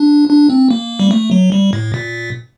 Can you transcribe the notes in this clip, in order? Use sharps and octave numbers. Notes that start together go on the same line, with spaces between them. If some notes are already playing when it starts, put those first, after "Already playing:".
Already playing: D4
D4
C4
A#3
G3
A3
F#3
G3
A2
A#2